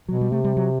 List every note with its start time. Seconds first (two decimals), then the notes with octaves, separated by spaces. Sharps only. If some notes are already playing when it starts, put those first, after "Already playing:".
0.08 B2 F#3
0.21 G3
0.32 C3 A3
0.44 G3
0.57 F#3